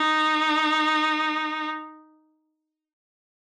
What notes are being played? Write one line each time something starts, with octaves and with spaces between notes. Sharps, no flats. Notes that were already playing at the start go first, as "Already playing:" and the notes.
Already playing: D#4